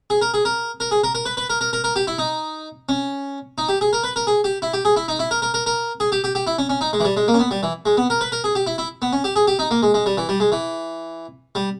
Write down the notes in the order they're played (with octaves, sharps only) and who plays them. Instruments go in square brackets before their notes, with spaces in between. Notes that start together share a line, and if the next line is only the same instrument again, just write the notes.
[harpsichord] G#4
A#4
G#4
A#4
A#4
G#4
A#4
A#4
B4
B4
A#4
A#4
A#4
A#4
G4
E4
D#4
C#4
D#4
G4
G#4
A#4
B4
A#4
G#4
G4
E4
G4
G#4
E4
D#4
E4
A#4
A#4
A#4
A#4
G#4
G4
G4
G4
E4
C#4
C#4
D#4
G#3
E3
G3
G#3
A#3
C#4
B3
G3
E3
G#3
B3
A#4
B4
A#4
G#4
G4
E4
E4
B3
C#4
G4
G#4
G4
D#4
A#3
G#3
G#3
G3
E3
G3
G#3
E3
G3